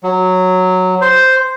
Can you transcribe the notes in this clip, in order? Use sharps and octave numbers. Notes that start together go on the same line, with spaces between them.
F#3
C5